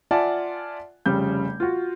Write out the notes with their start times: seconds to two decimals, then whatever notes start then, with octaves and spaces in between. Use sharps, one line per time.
0.11 F4 D5 E5 F#5 G#5 A5
1.06 F1 C#3 G3 G6
1.60 F4 F#4